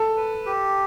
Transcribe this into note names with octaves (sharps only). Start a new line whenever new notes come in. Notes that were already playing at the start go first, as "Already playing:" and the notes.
Already playing: A4
B4
G4